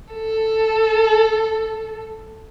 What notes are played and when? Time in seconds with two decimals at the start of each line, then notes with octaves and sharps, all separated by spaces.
0.14 A4